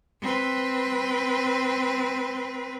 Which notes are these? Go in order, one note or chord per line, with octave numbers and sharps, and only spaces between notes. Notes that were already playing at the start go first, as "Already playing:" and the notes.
C4 B4